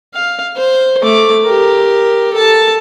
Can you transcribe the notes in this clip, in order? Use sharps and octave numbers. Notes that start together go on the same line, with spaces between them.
F5
C5
A3 D6
G4 A#4
A4 A5